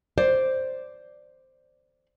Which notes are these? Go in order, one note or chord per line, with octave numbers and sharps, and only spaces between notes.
C5 D5